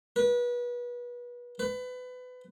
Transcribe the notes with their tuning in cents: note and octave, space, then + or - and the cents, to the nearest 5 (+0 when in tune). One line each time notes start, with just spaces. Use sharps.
B4 -30
B4 +25